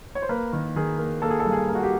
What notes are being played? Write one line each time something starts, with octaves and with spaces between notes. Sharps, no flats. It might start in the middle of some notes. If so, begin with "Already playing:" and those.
C#5
C5
A#3 B4
D#3
D#3 G#4
A#3
A#3 A4
G#4
A4
G2
G#4
A#3
F#4
G4